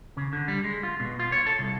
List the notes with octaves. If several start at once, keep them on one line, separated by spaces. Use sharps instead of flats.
C#3
D3
G3
G#3
F4
B2
F4
C#5
A4
C2